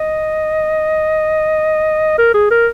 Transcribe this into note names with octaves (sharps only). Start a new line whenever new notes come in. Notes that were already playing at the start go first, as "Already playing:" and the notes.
Already playing: D#5
A#4
G#4
A#4